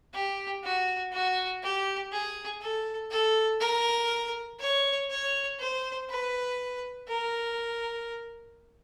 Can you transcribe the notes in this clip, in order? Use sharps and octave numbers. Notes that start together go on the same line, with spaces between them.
G4
F#4
F#4
G4
G#4
A4
A4
A#4
C#5
C#5
C5
B4
A#4